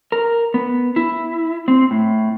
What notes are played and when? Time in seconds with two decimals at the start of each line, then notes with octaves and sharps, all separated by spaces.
0.12 A#4
0.54 B3
0.96 E4
1.68 C4
1.91 A2